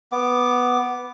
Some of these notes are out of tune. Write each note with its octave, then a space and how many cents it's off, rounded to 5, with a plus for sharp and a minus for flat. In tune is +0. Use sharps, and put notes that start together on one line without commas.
B3 +0 D6 +5